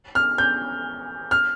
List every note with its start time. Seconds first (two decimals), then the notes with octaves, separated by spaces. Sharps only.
0.15 F6
0.38 G6
1.31 F6